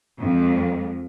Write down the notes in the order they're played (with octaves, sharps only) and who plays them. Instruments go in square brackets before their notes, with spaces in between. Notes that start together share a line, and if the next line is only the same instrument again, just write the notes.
[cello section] F2 G#3